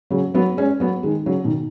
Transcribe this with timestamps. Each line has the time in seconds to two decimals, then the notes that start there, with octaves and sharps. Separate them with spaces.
0.11 C#3 F#3
0.34 F#3 B3
0.57 G#3 C#4
0.80 F#3 B3
1.03 D#3 G#3
1.26 C#3 F#3
1.44 B2 D#3